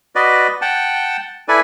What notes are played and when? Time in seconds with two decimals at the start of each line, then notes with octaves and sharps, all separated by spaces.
0.15 F#4 B4 D5 D#5
0.61 F#5 G5 A5
1.48 E4 A4 B4 D5 G#5